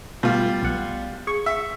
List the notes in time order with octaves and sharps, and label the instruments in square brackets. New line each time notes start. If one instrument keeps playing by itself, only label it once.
[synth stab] B2 A3 B3 [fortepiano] G3 F4
[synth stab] B1 B3 F#5
G#4 C#6
[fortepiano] E5